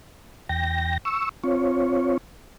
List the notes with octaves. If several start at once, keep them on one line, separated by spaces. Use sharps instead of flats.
E2 G5 A#6
C#6 E6
C4 F4 C#5